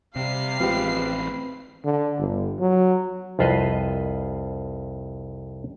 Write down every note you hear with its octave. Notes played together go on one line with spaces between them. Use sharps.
C3 G3 F5 C7
A1 F3 G#3 C4 G4 B4
D3
G1
F#3
C2 F2 F4 B4 C5 D#5